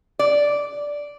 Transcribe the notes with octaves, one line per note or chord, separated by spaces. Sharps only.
D5